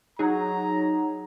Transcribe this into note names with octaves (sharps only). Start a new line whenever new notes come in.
F#3 D#4 G#4 A#5